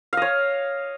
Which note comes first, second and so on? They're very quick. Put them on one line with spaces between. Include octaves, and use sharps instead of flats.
F5 D#5 C#5